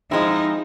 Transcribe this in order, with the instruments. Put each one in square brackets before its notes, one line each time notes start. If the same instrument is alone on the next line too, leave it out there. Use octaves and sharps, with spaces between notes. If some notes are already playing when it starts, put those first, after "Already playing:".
[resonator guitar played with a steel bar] F3 G#3 C4 E4 [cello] D#4